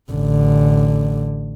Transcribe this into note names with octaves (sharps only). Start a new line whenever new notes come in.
A1 D3